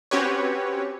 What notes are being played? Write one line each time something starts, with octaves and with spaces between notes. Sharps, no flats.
C4 C#4 F#4 G4 B4 C#5